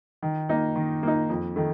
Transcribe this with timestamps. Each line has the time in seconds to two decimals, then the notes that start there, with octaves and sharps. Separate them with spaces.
0.23 D#3
0.49 A#3 D#4
0.76 D#3
1.03 A#3 D#4
1.29 F2
1.56 D#3 A3